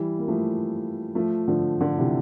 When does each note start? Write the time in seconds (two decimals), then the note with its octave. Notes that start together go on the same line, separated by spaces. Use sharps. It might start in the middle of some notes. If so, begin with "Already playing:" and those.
Already playing: E3 G3
0.19 A#3
0.28 F3 A3
1.15 F3 A3
1.48 D3 F3
1.81 D3 F3
1.98 C3 E3